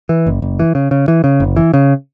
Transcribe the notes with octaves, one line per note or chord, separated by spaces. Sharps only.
E3
F#1
F#1
E3
C#3
C#3
E3
C#3
F#1
E3
C#3